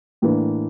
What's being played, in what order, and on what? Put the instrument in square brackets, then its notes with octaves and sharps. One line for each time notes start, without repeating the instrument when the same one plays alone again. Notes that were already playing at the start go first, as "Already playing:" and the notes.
[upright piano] A2 E3 A#3 D4